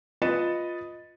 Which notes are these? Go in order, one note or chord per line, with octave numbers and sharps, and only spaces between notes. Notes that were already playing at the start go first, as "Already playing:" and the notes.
F4 B4 D#5 A6 C#7 E7